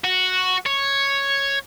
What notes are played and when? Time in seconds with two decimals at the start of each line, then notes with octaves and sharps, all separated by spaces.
0.04 F#4
0.66 C#5